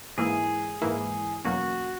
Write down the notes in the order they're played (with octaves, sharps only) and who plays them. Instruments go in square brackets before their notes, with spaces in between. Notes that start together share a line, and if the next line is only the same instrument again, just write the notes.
[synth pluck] G#2 E3 A#3 E4 [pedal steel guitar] G#4
[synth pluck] G#2 E3 A#3 E4
[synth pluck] E2 B2 F#3 A#3 C#4 [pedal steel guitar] F#4